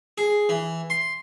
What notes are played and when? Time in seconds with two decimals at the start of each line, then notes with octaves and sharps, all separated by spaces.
0.18 G#4
0.49 E3
0.90 C6